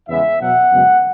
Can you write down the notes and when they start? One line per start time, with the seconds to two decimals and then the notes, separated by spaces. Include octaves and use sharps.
0.09 E2 C#3 E3 G#3 B3 E5
0.40 B2 F#3 B3 F#5
0.72 F#2 C#3 G#3 B3